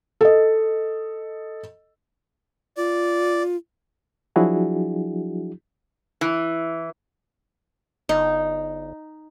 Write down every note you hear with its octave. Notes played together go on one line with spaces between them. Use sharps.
A4 D#5
F4 D5
F3 F#3 D4 E4 F#4 G#4
E3
G1 D#4